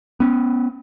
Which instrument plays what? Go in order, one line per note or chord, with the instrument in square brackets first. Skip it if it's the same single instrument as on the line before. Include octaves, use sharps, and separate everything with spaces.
[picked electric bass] B3 C#4